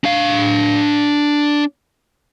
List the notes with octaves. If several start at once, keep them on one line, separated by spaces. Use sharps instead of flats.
D4 F5